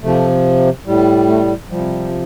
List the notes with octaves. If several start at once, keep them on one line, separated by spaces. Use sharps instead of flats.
C3 F3 A3
A2 G3
A3
C3 F3 G3